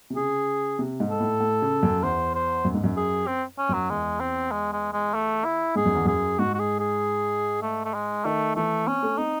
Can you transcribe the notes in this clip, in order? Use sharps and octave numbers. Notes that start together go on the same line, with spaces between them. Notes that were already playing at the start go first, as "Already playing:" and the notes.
C3
C#3 G#4
C3
G#2
A4
A2
A2
C#3
F#2
E2 C5
C5
F#2
G#2
F#2
G#4
C4
C#4
F#2 F#3
E2 G#3
C4
G#3
G#3
G#3
A3
E4
G#2 G#4
F#2
E2
F#2 G#4
G#2 F#4
F#4
G#4
G#4
A3
A3
G#3
D#3 A3
E3 A3
C4 C#4
A3
C4 D#4